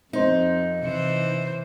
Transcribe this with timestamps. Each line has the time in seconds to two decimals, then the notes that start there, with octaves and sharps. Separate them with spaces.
0.13 F2 C4 D#4 C5
0.82 C3 E3 C5 C#7